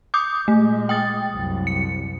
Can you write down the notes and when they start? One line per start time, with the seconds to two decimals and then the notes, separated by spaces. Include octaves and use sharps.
0.14 D6 D#6 G6
0.48 A#2 G#3 A3
0.89 G5 D#6 A6
1.30 C2 F#2
1.67 C#7